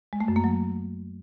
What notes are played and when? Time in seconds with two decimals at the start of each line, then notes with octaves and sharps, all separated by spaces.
0.13 G#3
0.20 A3
0.28 F#2
0.36 A#3
0.44 F#3